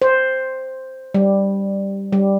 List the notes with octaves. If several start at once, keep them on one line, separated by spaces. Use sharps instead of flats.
C5
G3
G3